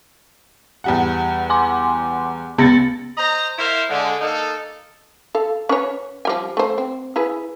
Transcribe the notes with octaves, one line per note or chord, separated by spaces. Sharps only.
E2 G3 F#5
G#5 C6 D6
C#2 B3 A6 A#6 C#7
C5 D#5 A#5
E4 A#4 C5 E5 F5
D3 G#3
A#3 D#4 A4
A4 F5
C#4 B4 C#5
F3 G3 G#5
A3 C5
C4
E4 G#4 B4